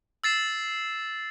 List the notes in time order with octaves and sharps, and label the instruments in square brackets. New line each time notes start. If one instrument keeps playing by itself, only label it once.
[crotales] E6 A6 C7 E7